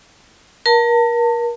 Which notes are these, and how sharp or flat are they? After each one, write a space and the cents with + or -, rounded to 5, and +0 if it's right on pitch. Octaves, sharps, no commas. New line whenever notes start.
A#4 +30 A5 +40